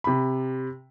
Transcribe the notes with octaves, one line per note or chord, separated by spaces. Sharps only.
C3 B5